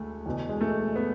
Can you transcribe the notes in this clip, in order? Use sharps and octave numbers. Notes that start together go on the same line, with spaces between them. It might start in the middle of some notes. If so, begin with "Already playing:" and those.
Already playing: D2 G#3 A3
E2 B2
G#3
A3
B3